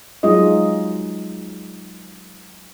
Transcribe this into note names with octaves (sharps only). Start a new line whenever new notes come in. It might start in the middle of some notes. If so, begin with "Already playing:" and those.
F#3 G#3 D#4 F4 D#5